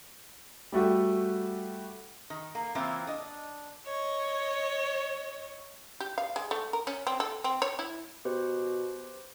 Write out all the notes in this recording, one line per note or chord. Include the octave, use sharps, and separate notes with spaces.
G3 A3 F#4 G4
D#3
A#3
C#3 E3 A#3 C4 E4 F4
D4 D#5
C#5 D#5
G4
F5
G#3
A3
A#4
C#4
C4
A4
C4
C#5
E4
B2 G4 B4 C5